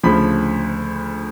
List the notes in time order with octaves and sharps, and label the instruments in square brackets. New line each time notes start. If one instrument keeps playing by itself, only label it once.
[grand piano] D2 C#3 F3 B5